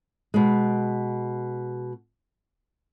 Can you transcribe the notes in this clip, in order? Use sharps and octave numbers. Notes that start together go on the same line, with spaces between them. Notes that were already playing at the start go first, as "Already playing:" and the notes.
B2 G#3